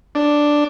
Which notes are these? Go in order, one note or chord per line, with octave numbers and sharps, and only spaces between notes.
D4